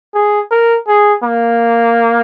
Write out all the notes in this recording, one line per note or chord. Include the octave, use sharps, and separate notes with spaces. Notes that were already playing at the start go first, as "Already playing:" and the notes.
G#4
A#4
G#4
A#3